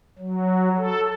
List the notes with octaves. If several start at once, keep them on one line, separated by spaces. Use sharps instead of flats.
F#3
A4